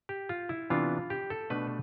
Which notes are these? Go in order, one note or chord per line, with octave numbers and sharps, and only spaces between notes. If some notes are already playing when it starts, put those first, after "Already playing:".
G4
F4
E4
C3 E3 B3 D4 F4
G4
A4
B2 A3 D4 B4